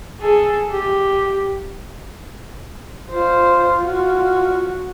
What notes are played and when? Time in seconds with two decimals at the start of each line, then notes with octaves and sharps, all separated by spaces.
0.20 G#4 A4
0.71 G4
3.11 F4 C5
3.84 F#4